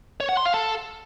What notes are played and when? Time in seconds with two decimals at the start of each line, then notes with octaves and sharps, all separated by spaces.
0.20 C#5
0.29 F#5
0.37 C6
0.45 F5
0.54 A4